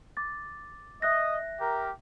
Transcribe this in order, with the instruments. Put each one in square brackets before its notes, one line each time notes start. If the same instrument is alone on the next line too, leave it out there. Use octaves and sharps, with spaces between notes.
[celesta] D6 A6
[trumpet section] D#5 [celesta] E5 F#6 A#6
[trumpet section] G4 A#4